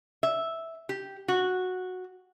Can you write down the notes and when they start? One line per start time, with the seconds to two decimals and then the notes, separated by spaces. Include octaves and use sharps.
0.23 E5
0.89 G4
1.28 F#4